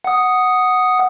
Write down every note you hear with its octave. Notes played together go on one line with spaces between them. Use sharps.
F#5 D#6